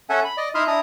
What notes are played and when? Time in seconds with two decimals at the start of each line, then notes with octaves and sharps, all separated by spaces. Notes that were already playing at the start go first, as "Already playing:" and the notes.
0.10 C#4 A4 E5 F#5 G#5
0.25 B5
0.37 D5 D#5
0.55 D#4 E4 E5 C6 D#6 F6
0.67 D4 E4 A#5 D#6